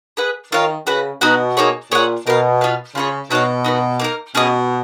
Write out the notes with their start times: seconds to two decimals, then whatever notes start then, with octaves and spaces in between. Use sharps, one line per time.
0.17 G#4 B4 F#5
0.52 D#3 F4 A#4 C#5 F5
0.87 C#3 F#4 B4 F#5
1.21 B2 D#4 F#4 B4 F#5
1.57 A#3 D#4 G#4 C#5
1.91 A#2 G#4 C#5 F#5
2.26 B2 D#4 A#4 F5
2.61 B3 F4 B4 F5
2.95 C#3 F4 G#4 C#5
3.30 B2 D#4 F#4 C#5 F5
3.65 D#4 F#4 B4
4.00 A#3 D#4 A#4
4.35 B2 C#4 G#4 D#5